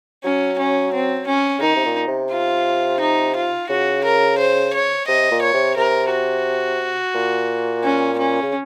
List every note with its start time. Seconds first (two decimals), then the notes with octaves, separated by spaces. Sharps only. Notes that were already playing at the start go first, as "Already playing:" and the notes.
0.24 F#3 C#4
0.59 C#4
0.94 C4
1.27 C#4
1.58 C#3
1.62 D#3 D#4
1.76 C3
1.86 A#2
2.08 C3
2.31 F4
3.00 D#4
3.36 F4
3.69 C#3 F#4
4.04 A#4
4.38 C5
4.74 C#5
5.07 C3 D#5
5.31 A#2
5.42 C#5
5.54 C3
5.77 C3 A#4
6.11 F#4
7.15 A#2
7.84 C#4
8.18 C#4
8.42 C#3